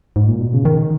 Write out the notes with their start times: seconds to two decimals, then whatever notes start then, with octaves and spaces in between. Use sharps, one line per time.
0.16 G#2
0.28 A#2
0.40 B2
0.53 C#3
0.65 D#3